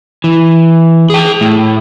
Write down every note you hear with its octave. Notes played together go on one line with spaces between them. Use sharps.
E3
G#4 G5
A2